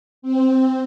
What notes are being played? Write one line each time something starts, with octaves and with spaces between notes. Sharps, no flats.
C4